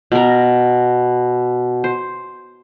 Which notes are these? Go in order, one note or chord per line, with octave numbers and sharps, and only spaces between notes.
B2 A#4
C5